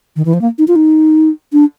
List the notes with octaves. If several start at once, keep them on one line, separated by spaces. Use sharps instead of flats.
D#3
E3
F3
A#3
D#4
F4
D#4
D4